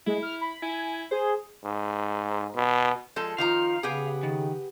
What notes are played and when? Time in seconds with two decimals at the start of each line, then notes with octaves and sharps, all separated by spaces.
0.07 G#3 E4
0.23 F6
0.41 B5
0.62 E4 G#5
1.11 G#4 C5
1.65 G#2
2.55 B2
3.16 F3 G#3 A4
3.38 D#3 F3 F4 F5 A#5
3.83 C#3 B3 G4 G#4
4.23 D#3